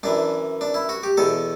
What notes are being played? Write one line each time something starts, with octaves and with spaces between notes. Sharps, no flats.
F#2 E3 D4
D4
E4
F#4
G4
E2 B2 A4